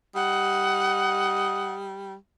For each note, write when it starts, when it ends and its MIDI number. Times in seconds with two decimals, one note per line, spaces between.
0.15 2.15 55
0.15 1.92 75
0.15 1.74 78